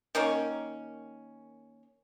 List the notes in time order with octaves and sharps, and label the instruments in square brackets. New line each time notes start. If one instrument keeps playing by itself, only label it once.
[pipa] D#3 A#3 C#4